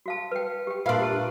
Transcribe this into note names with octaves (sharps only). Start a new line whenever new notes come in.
F#4 F5 A5
B4 G5
G4 G5
A#2 D4 F4 A#4 B4 E5 F5 C6
G4 A5